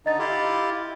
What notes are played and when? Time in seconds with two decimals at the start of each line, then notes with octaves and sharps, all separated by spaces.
0.06 D3 D#4 D#5 A6
0.19 E4 F4 G4